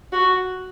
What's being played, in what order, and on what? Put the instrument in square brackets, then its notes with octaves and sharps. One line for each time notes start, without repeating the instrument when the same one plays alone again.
[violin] F#4